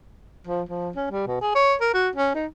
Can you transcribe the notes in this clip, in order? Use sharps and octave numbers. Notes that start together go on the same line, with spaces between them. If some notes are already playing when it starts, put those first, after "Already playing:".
F3
F3
C#4
G3
B2
G#4
C#5
A#4
F#4
C#4
D#4